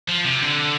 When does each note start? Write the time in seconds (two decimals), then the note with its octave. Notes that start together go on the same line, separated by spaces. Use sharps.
0.09 F3
0.26 C3
0.42 D3